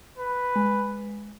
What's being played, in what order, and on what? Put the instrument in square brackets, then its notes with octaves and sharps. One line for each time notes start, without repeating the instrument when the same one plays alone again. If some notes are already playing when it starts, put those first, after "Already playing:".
[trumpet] B4
[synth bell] G#3